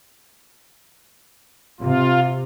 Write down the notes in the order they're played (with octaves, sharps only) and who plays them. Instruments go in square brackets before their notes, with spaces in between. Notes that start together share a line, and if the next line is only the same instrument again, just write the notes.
[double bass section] C3 [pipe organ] F4